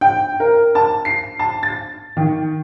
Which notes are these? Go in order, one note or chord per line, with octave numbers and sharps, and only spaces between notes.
G5
A#4
A5
C7
A5
A6
D#3